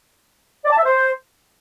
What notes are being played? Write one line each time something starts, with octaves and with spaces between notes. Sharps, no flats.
D5
A5
E5
C5